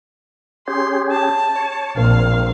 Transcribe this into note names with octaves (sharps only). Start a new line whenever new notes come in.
C#4 G4 G#4 C6
A5
C#5
A#1 A#3 C4 F5